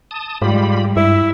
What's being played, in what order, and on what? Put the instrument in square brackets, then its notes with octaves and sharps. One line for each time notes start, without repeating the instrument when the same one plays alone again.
[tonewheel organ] A5 D#6
[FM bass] G#2 [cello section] G3 G#3 [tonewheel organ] F4 G4 B5
[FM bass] G2 [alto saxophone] E4 [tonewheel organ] E5